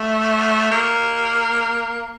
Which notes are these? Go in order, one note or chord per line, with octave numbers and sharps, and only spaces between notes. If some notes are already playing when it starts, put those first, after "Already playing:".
Already playing: A3
A#3